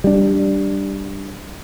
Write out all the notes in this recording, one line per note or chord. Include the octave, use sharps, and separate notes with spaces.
G3 D4